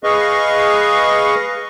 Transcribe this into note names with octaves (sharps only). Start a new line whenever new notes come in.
G#4 B4 D#5 F5 C#6